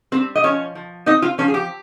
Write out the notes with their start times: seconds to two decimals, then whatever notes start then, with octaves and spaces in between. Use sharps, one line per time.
0.12 G3 C4 C5
0.35 D#5
0.44 F3 C#4 C#5
0.75 F3
1.06 C4 D#4 D#5
1.22 F4 F5
1.38 F3 C#4 C#5
1.48 G#4
1.54 G4